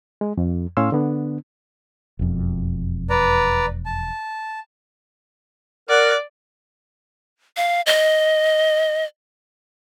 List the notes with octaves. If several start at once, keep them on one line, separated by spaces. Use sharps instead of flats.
G#3
F2
A2 C#4 C#5 F5 C6 E6
D3 B3 D4
E1 F2
B4 D5 A#5
A5
A#4 D5 F#5
F5
D#5